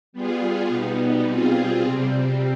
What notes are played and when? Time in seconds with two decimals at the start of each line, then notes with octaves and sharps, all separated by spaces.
0.13 G3 B3 F4 G#4
0.68 B2 G3 B3 D#4
1.24 B2 G3 C4 F4 G#4
1.81 C3 G3 C4